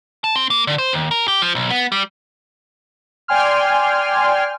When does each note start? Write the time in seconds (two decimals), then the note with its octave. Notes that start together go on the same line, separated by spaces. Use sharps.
0.24 A5
0.36 C4
0.50 A#3
0.67 D3
0.78 C5
0.93 D#2
1.11 A#4
1.28 G4
1.42 F3
1.55 B1
1.70 B3
1.92 G3
3.28 D5 G5 G#5 C6 F6